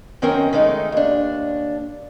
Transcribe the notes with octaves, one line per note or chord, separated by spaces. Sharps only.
F#2 D#3 C4 C#4 A#4 G5
D#3 G#3 A3 D#4
D#2 D4